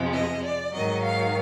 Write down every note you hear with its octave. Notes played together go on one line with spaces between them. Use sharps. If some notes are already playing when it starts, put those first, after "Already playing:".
Already playing: F2 C3 F3 G#3
D#5
D5
G#2 D#3 F#3 D#5
F5